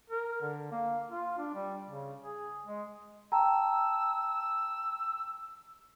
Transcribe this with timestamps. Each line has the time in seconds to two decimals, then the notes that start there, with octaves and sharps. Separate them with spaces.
0.10 A#4
0.41 D3
0.72 A#3
1.11 F4
1.38 D4
1.54 G3
1.89 C#3
2.22 G#4
2.67 G#3
3.32 G5 A5 A#5 E6